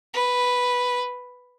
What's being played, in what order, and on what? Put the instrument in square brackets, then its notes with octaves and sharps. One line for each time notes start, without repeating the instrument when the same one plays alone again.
[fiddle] B4